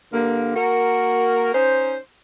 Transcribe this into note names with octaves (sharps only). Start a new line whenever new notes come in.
G2 D3 A#3
A#3 F#4 A#4
C#4 D#4 C5